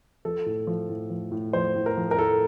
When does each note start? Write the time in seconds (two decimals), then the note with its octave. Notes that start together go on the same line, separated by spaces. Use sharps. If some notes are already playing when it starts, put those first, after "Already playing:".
0.25 F3 A4
0.46 A2
0.67 F3
0.89 A2
1.10 F3
1.32 A2
1.53 F3 C5
1.76 A2
1.86 A#4
1.97 F3
2.11 A#4
2.18 A2 A4